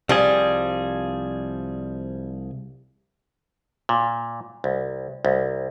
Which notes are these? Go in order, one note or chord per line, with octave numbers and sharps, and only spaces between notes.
C2 F3 G3 G#4
A#2
C2
C2